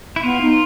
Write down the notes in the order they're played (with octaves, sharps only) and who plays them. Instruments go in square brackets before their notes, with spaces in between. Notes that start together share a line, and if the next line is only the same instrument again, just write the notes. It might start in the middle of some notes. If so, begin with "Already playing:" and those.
[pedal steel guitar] E4
[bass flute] B3 [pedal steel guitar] F4
[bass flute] D#4